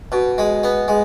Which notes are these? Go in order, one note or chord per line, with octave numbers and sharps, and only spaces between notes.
B2
G#3
B3
G#3